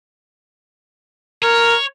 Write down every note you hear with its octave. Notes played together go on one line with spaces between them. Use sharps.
A#4 C#5